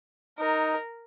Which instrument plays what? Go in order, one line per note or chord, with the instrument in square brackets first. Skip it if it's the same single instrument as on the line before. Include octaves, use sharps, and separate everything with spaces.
[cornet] D#4 [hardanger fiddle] A#4